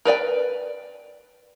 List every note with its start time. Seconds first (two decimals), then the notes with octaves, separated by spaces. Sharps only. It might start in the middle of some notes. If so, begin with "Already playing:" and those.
0.05 A#4 B4 D5 G5